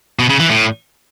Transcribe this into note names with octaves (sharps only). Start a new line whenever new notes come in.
B2
C#3
E3
A2